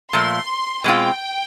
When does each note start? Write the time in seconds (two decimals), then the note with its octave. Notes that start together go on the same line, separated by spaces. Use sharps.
0.13 A#2 F3 A3 C6
0.84 B2 G#3 C4 F4 G5